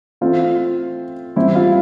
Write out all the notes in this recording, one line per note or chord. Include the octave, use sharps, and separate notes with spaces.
E3 A3 C4 F4
E3 G3 C4 E4
F4